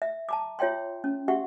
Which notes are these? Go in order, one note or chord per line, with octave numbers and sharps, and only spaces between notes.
E5
A5 A#5 D6
F4 C#5 E5 G5 C6
C#4
F#4 G4 E5 F#5 C#6